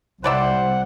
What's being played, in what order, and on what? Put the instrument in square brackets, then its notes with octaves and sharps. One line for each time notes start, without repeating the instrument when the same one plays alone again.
[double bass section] C2 [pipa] G3 D5 E5 [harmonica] C5 [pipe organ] F#5